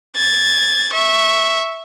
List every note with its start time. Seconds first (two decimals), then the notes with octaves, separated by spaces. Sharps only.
0.16 G#6 A6
0.93 E5 C#6